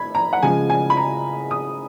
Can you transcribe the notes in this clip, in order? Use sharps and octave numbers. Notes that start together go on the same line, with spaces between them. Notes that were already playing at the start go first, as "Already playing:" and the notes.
Already playing: B5 G#6
A#5
F#5
C#3 F3 G#3 G#5
G#5
B5
A#5
D#6